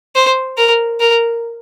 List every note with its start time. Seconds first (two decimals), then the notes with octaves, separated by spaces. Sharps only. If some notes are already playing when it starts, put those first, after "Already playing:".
0.15 C5
0.57 A#4
1.00 A#4